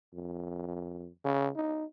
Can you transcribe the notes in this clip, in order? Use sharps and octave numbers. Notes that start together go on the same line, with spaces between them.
F2
C#3
D#4